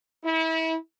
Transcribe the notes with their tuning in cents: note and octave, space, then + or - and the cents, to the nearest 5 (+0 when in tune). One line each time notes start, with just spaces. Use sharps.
E4 -30